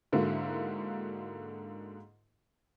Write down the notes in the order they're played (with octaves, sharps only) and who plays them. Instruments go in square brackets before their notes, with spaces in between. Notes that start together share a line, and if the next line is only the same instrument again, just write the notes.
[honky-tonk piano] G#2 D3 A#3 E4 F#4